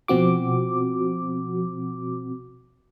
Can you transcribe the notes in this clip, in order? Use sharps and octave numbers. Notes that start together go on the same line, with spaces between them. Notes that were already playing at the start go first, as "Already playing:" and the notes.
B2 F3 C4 F#4 D6